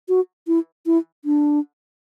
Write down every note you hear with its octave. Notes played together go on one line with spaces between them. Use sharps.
F#4
E4
E4
D4